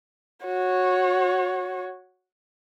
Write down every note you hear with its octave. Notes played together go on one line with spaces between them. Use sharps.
F#4 C#5